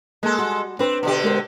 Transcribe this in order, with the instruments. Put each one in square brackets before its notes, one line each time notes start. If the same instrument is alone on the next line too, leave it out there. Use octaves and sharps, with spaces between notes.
[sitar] G#3 A4 [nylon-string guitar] A#3
[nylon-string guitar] G3 F#4
[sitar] C4 [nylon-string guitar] D4 B4
[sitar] B2 D3 G4
[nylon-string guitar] G#3 A#4 C5